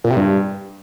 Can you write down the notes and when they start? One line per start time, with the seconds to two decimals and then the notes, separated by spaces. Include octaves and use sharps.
0.04 A#2
0.10 C3
0.16 G2